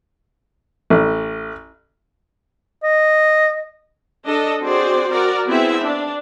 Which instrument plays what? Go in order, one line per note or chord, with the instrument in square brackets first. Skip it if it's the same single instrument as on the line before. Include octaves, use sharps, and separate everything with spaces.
[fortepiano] A1
[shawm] D#5
[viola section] D4 A4 D#5
C4 F#4 G#4 C5 D5
F#4 A#4 D5
B3 C4 E4 G#4 E5
D4